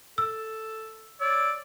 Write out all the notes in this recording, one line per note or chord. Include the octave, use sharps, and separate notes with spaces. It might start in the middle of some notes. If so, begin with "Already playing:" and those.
A4 E6
C#5 D5 E6